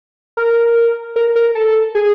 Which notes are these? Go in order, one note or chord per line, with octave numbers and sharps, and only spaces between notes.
A#4
A#4
A#4
A4
G#4